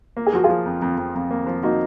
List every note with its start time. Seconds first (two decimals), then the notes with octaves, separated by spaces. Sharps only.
0.17 A#3
0.27 G#4
0.33 F3 F#4
0.44 F4 G#4
0.50 F3
0.65 F2
0.82 F2
0.98 F2
1.15 F2
1.31 A#3
1.47 F3
1.63 A#3 D#4 F#4